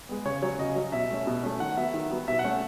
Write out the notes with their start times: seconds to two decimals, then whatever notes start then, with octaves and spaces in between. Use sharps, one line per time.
0.09 G#3 B3
0.26 C#3 C#5
0.42 F#3 C#4 C#5
0.59 C#3 D#5
0.76 F#3 C#4
0.92 B2 E5
1.10 A3 C#4
1.27 B2
1.43 A3 C#4
1.60 D#3 F#5
1.77 F#3 B3 E5
1.94 D#3
2.11 F#3 B3
2.28 B2 E5
2.39 F#5
2.44 A3 C#4